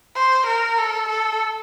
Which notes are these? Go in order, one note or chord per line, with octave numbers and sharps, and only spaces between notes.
C5
A#4
A4
A4